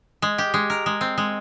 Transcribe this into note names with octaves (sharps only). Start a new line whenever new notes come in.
G#3
G4
G#3
A#4
G#3
C4
G#3